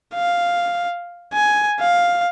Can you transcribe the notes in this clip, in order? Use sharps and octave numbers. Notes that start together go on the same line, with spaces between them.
F5
G#5
F5